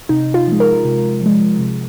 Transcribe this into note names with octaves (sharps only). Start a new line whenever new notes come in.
C3 D#4
F4
F3 G#3
A#4
C3
F3 G#3
C3